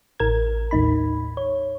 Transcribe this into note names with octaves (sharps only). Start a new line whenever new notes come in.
A1 A#4 G#6
D#2 A2 D#4 B5
C#5